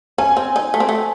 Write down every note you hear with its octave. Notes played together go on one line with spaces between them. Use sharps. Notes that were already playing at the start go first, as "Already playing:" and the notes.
C#4 G#5
C4
D#4
A3
C4
A3